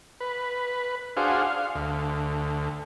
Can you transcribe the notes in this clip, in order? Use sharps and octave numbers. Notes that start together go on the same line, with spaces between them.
B4
D4 F#4 G#4 C5 F5
F5
D2